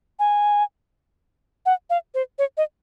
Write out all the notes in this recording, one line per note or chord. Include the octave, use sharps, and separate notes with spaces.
G#5
F#5
F5
C5
C#5
D#5